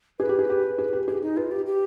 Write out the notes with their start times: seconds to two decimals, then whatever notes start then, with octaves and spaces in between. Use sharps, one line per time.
0.19 G#4 B4
0.29 G4
0.39 G#4
0.50 G4
0.78 G#4
0.93 G4
1.08 G4 G#4
1.22 D#4
1.37 F4 B4
1.51 G4
1.66 G4